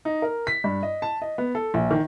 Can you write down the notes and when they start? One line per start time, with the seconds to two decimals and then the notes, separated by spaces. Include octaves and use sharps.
0.05 D#4
0.22 A#4
0.47 B6
0.64 G2
0.83 D#5
1.02 A5
1.22 D#5
1.38 B3
1.55 A4
1.74 A#1
1.91 D#3